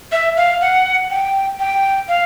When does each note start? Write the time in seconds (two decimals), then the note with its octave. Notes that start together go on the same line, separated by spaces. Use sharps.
0.12 E5
0.37 F5
0.61 F#5
1.10 G5
1.60 G5
2.08 F5